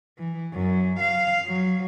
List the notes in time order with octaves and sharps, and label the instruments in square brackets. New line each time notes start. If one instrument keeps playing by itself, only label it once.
[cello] E3
F#2
F5
F#3